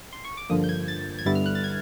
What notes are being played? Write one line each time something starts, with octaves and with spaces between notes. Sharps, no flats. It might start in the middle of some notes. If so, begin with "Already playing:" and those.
C6
C#6
D6
G2 D3 F3 A#3 D#6
G6
G#6
A6
G#6
G2 D3 G3 B3 E4 A6
F6
F#6
A6
G#6